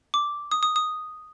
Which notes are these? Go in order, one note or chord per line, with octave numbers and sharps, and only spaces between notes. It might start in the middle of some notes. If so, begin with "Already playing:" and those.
D6
D#6
D#6
D#6